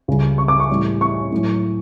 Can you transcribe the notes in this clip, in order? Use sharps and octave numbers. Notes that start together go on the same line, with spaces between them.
C#2 C#3 G3
C#6
D6
C#6
A2 E3 G3
C#6
A2 F#3